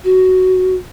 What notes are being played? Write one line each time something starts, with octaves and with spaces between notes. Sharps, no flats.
F#4